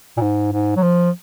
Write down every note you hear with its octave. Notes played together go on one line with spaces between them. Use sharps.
A#2
G#2
G#2
F#3
F3